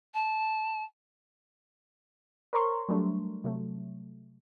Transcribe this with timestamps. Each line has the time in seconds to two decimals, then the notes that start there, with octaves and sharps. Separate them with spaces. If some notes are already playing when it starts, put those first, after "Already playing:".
0.14 A5
2.53 A#4 C5 C#5 A#5 C6 C#6
2.89 F#3 G3 A3 D4
3.44 C3 F#3 A3